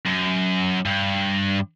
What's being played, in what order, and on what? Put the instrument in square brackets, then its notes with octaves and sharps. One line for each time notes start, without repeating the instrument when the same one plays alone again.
[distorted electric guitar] F#2
G2